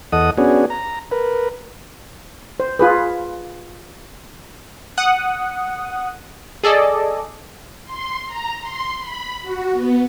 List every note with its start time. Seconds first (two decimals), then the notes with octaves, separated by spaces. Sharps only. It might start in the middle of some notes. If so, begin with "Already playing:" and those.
0.12 E2 A4 D#5 F#5 D#6
0.38 B3 C#4 D4 F#4 G#4
0.70 A#5
1.11 A#4 B4
2.60 C5
2.79 F4 G#4 B4
4.97 F#5 D#6
6.64 G#4 A4 D5 D#5
7.85 C6
8.27 A#5
8.61 C6
8.99 B5
9.42 F#4
9.73 B3